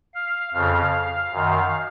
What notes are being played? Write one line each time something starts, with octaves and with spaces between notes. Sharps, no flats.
F5
F2 C#3 F5
F#2 D#3